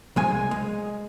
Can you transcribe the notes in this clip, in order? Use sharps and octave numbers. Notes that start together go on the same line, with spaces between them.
C2 G#3 G#5
G#3